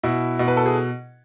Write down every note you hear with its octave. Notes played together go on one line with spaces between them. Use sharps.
B2 E4
B2
B4
A4
G#4